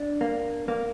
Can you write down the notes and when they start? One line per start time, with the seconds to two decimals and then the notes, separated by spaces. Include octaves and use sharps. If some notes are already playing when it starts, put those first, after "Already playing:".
Already playing: D4
0.21 A#3
0.68 A#3